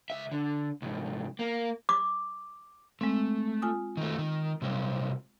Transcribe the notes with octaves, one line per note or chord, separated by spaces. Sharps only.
C#2 E5
D3
C2 G#2
A#3
D6
G#3 A3 C4
F4 G#5 D#6
D#3 A3
D#3
C3 F#3 G3